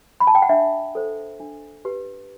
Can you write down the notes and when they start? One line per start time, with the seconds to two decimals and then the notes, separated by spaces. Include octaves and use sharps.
0.20 B5
0.27 A5
0.35 G5
0.42 F#5
0.49 D4 E5
0.95 A4 C5
1.40 D4
1.85 G4 B4